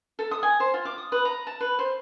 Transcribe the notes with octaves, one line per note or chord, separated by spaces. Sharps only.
A4
D#6
G#5
C5
F4
D6
D#6
B4
A#5
A5
B4
C5